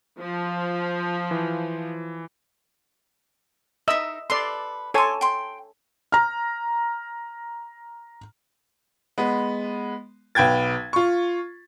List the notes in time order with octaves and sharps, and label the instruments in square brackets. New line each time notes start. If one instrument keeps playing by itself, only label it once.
[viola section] F3
[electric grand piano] E3
[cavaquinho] D#4 A#4 [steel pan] D#5 E5 E6
[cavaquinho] A4 B4 [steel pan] D5 C6
[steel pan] A4 C#5 G#5 [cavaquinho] C6 D6
[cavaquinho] G5 C6
[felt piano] A#5 F6
[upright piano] G#3 B3
B1 B4 G5 G#6 A6
F4 C#6